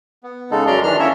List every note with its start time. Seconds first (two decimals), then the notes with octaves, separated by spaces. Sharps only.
0.23 B3
0.51 C#3 G#3 D#4 A4
0.67 F#2 C#4 D5 A#5 C6
0.83 D#3 E3 D4 F6
0.99 A#3 C#4 A#4 C#5 E5